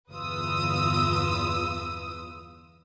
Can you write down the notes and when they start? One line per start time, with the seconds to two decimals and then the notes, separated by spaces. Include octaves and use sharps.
0.11 G1 E2 F4 B4 D#6 E6